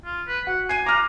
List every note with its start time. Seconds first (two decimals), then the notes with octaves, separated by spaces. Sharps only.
0.05 F4
0.28 B4
0.47 F#4 F#5
0.69 G#5 C7 D#7
0.86 A#5 D6 F6 F#6